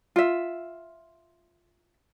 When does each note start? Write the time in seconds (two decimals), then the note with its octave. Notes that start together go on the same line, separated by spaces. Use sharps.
0.16 F4 E5